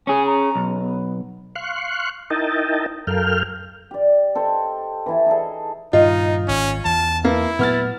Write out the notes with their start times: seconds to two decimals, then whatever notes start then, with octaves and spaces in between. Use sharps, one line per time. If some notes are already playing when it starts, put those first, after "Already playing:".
0.07 C#4 G#4 G#5
0.26 A#5
0.55 B1
0.77 B3
1.55 F5 C6 C#6 F#6
2.30 D#4 E4 A#4 D#5 G5 A5
3.07 F#2 A4 A#4 F5 G5 F6
3.91 G4 D5
4.35 A4 C5 D#5 G5
5.06 E3 E4 A5
5.26 D#4 G#4 A4
5.93 G2 A#2 D#3 D#4 F4 D#5
6.48 G#1 C#4
6.85 E2 E3 A5
7.25 A#3 E4 B4
7.59 A#2 F#3 A3 B3 F6 A6